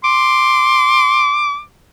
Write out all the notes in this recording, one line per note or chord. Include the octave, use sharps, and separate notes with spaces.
C6 D6